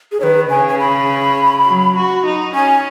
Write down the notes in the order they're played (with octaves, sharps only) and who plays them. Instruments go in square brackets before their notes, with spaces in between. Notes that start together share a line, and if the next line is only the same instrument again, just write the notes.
[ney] G#4
[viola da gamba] D#3 [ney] B4 C#5
[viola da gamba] C#3 [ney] G#5
[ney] G#5
B5
[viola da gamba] F#3
F#4
D#4
[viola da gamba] C#4 [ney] G#5